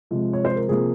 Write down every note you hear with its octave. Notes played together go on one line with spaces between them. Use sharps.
C3 F3 G#3
C#5
C5
A#4
C3 F3 A#3 G#4